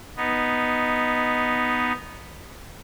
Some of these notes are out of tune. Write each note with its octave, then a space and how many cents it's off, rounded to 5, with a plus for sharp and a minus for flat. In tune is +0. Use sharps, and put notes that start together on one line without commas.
B3 +0 D#4 +0